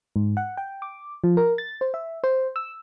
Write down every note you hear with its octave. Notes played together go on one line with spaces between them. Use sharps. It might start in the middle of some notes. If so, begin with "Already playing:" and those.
G#2
F#5
G5
D6
F3
A#4
A6
C5
E5
C5
E6